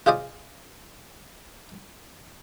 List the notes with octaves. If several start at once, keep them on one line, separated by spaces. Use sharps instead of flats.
F4 G#4 C5 D5 D#5